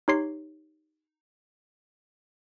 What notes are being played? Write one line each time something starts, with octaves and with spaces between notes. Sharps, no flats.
D#4 G4 C#5 C6 C7